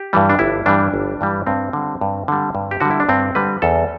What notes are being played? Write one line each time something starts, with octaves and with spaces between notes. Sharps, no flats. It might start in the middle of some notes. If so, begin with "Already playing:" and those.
Already playing: G4
G2 E3 G3
D4
G1 E4
G2 E3 G3 D4
G1
G2 E3 G3
G2 C4
D3 G3
G2
D3 G3
G2
G4
D3 G3 F#4
E4
D4
G2 C4
D3 G3 B4
E2 A4